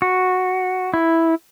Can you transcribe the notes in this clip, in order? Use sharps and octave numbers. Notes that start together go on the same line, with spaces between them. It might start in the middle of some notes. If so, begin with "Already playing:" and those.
F#4
E4